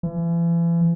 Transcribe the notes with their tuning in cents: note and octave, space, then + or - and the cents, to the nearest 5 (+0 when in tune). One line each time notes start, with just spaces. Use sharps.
E3 +40